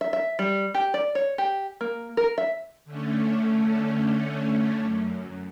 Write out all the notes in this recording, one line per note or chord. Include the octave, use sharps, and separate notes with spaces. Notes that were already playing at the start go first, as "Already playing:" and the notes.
E5
E5
G3
G4
D5
C#5
G4
A#3
A#4
E5
D3 A3 C#4
F#2